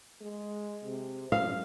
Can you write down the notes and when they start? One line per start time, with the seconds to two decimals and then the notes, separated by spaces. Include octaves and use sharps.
0.21 G#3
0.85 C3
1.32 F#2 F5